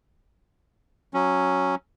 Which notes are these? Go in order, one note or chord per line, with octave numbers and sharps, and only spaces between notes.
F#3 C#4